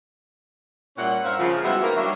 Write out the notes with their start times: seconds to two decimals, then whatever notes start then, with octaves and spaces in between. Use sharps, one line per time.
0.98 A#2 G3 C#4 E4 F#5
1.24 G2 A#4 C5 E5 F5
1.39 C#3 F3
1.64 G3 G#3 B3 E4 F#4 C5
1.82 D#3 A#3 A#4
1.97 F#3 G3 D4 F#4 E5